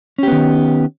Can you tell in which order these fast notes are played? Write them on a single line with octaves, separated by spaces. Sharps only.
C#4 G4 B3 D#3